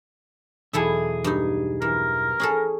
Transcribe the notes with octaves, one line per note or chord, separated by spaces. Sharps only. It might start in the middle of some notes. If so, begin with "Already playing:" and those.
B1 E2 E4 G#4 A4 E5
G2 D#4
E3 A#4
C#4 G#4 A4